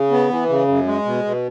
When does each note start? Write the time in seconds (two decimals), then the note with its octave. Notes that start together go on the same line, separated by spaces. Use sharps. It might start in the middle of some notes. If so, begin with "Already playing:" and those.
Already playing: C#3
0.11 B3
0.30 E3
0.49 C#3
0.68 F#2
0.86 G#3
1.05 B2
1.24 B2